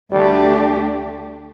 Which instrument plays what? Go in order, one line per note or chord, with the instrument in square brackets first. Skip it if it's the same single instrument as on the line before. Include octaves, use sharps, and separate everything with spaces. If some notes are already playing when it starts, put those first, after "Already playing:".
[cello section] D2 D3 A3 D4 G4 [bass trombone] G3